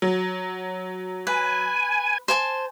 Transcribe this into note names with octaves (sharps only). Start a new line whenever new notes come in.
F#3
B4 G#5
C5 G#5 A5